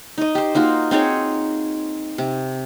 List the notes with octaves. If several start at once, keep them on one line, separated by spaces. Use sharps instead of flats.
D#4 D#5
G4 C5
A#3 D#4 F4 F#4
C4 D#4 G#4 C#5
C3